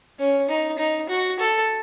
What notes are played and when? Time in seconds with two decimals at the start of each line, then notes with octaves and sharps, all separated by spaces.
0.19 C#4
0.49 D#4
0.79 D#4
1.09 F#4
1.39 A4